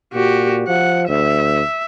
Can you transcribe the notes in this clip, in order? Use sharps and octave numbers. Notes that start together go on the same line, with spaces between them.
A#2 F#4 G4
F3 F#5
D2 E5